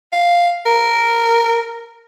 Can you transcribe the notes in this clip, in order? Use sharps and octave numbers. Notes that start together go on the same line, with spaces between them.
F5
A#4